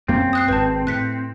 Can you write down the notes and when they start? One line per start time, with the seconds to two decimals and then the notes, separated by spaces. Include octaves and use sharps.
0.08 F#2 A#3 C4 C#4
0.33 D#6 F#6 C7
0.48 G#1 G#2 B4 A5
0.87 A2 F#6 B6 C#7